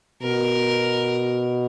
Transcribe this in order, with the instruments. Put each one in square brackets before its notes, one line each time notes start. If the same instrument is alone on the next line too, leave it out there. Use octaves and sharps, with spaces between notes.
[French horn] B2 [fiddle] A#4